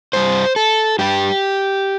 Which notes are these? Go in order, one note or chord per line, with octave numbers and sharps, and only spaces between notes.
G2 G3 C5
A4
G2 G3 G4